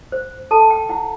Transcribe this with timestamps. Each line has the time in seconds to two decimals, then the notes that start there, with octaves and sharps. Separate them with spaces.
0.12 C5
0.51 A4 A5
0.70 G5
0.89 E4 F#5